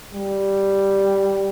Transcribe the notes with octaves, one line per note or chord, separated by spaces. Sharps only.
G3